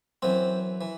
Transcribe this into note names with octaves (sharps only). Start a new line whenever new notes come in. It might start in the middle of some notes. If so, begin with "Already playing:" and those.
F#2 E3 C4
E3